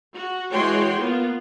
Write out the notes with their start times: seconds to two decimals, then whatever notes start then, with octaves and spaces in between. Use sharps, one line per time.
0.14 F#4
0.51 E3 G#3 F#4 C#5 G5 C6
1.00 A#3 B3 F4